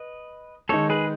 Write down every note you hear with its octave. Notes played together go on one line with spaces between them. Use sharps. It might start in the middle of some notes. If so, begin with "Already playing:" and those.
Already playing: B4 D#5
D#3 G#3 D#4 A4 C#5
G#4 B4